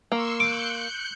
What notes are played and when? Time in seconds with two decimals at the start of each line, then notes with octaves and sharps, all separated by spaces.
0.12 A#3 C6 C#6 E6
0.40 D6 F#6 G6 C#7